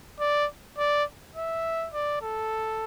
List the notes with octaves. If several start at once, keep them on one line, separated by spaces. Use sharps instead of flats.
D5
D5
E5
D5
A4